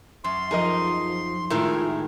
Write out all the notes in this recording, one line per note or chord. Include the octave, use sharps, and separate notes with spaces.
F#2 E5 C6
F3 D#4 G#4 A#4 D#5
A2 D#3 G#3 E4 F4 A#4